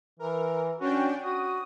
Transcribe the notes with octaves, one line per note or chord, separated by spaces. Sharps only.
E3 A#4
C#4 D4 F#4 G5
F#4 D#6